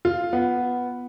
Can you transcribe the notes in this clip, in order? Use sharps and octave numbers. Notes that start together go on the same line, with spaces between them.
F4
B3